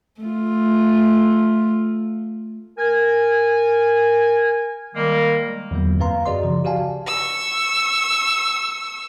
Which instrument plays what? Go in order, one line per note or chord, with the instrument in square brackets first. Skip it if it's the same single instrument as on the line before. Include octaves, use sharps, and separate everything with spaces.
[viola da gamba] A3 F4
[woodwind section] A#4 G#5
D#3 G3 G#3 A#3
[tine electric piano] E2 D3 F#3 A#3
F#2 C4 B4 F5 A#5 C6
F#4 G#4 D5 D#5 C6
C#3 F3
F#4 G4 D5 F5 G#5 A5
[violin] C#6 E6